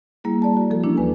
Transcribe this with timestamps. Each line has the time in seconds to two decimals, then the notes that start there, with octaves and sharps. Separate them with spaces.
0.24 G3 A#3 E4 G#4
0.42 D5 A5
0.57 F#4
0.70 F3 A4
0.83 E3 A#3 C#4 D4 E4
0.97 D#2 B4 G#5